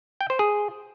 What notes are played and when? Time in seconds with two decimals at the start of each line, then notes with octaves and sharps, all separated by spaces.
0.21 G5
0.30 C5
0.39 G#4